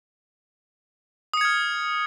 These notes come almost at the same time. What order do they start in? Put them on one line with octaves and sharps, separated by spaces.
D#6 C#7 G#6 F6